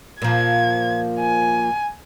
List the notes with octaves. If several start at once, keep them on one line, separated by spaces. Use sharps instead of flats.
A#2 F3 G#6
G#5